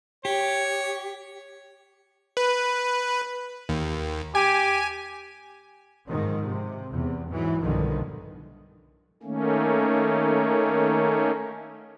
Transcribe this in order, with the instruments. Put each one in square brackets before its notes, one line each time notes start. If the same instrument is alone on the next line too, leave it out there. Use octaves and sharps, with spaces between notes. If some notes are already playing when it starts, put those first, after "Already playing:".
[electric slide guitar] G4 [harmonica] C#5
[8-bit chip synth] B4
D#2
[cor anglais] G4 [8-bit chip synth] G#5
[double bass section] G#2 D#3 F3
C3
E2 C3
G#2 E3 F#3
B1 G2 A#2 D3 D#3 F3
[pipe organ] D#3 A3 A#3 C#4